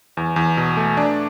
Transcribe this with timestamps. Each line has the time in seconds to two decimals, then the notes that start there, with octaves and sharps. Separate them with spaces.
0.17 E2
0.36 E2
0.57 B2
0.77 A3
0.97 D4